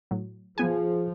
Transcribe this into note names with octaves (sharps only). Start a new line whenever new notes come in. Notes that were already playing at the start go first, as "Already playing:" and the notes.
A2 F#3
F3 B3 F4 G#4 G#5